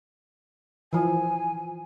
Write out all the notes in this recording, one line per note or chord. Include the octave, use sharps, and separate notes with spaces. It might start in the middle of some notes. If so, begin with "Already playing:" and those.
E3 F3 G#5